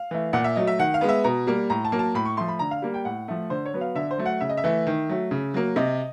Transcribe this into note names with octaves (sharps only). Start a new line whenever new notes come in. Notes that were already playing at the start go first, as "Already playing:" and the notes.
Already playing: F5
E3 A3
A#2 F#5
E5
F#3 A3 D#5
E5
D#3 F#5
F5
G#3 B3
E5
B2 A#5
G3 A#3
A2 A#5
A5
F#3 A#3
A5
A2 B5
C#6
F3 A3 C6
B5
D3 A#5
F5
G3 A#3
G5
A2 F#5
F3 A3
D3 C5
C#5
F#3 B3
F5
D3 E5
C5
F#3 A3
F#5
C#3 E5
D#5
E5
E3 A3
D#3
F#3 A3
C#3
F#3 A#3
C3 D#5